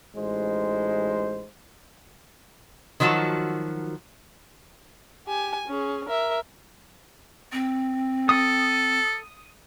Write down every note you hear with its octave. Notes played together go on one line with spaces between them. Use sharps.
A1 G#3 D#4 C5
D#3 F3 F#3 F#4 A5
G4 G#5
C#4 G#4
A#4 E5
C4
A4 D#6